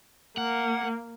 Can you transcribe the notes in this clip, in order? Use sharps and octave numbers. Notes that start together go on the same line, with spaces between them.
A#3 F#5